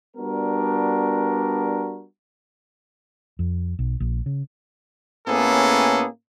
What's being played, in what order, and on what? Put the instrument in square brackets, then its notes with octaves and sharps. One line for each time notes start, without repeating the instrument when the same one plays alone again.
[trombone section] G3 B3 D4 F#4 A#4
[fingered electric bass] F2
B1
A#1
C#3
[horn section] A2 A#3 B3 C#4 G#4 A4